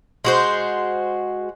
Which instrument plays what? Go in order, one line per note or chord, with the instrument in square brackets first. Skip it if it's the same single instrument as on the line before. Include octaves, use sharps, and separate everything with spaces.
[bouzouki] G#3 F#4 C5